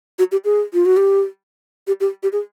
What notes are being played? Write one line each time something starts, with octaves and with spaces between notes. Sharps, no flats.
F#4
G4
G#4
F4
F#4
G4
G4
G4
G4
G#4